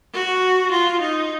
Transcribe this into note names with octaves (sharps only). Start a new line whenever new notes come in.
F#4
F4
D#4